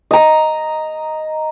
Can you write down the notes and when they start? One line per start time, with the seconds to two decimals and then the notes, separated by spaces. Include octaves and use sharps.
0.11 D#5 A#5